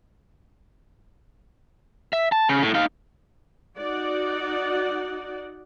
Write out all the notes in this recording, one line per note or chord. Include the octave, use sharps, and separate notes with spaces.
E5
A5
C#3
A2
D#4 F5
D#4 F#4 D5 F#5